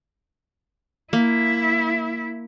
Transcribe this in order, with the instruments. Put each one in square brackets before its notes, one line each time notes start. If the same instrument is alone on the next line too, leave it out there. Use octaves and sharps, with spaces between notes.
[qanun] A#3 [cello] E4 E5